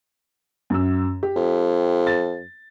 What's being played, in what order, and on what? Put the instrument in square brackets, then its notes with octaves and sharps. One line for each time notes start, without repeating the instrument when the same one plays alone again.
[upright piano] F#2 E6
G4
[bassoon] F2
[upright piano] A6